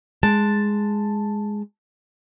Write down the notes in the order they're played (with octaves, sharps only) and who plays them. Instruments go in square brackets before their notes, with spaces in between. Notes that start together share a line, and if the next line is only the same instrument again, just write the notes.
[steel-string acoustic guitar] G#3 A5